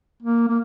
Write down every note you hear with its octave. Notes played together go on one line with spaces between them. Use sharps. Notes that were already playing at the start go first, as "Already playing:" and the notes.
A#3
A#3